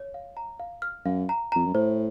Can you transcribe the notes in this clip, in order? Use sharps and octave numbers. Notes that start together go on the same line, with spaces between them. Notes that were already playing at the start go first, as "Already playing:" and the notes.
Already playing: C#5
F5
A#5
F5
F6
F#2 F5
A#5
F2 A#5
F#2
A2 C5